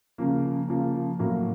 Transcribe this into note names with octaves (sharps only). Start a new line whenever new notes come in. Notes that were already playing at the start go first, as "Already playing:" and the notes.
C#3 F3 A#3
C#3 F3 A#3
A2 F#3 A#3